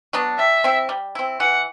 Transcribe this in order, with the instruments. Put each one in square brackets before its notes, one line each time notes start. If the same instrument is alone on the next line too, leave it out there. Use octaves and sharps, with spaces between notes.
[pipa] F#3 B3 D4
[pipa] G3 [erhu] E5
[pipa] C4 E4
G3
C4 E4
[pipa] E3 [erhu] F#5